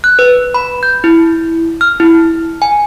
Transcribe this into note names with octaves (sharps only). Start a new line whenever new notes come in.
F#6
B4
B5
G6
E4
F6
E4
G#5